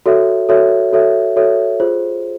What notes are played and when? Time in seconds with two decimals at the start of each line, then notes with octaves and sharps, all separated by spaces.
0.06 F#4 A4 C#5 E5
0.49 F#4 A4 C#5 E5
0.93 F#4 A4 C#5 E5
1.36 F#4 A4 C#5 E5
1.80 F4 G#4 C5